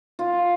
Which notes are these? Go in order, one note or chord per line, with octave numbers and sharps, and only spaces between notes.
F4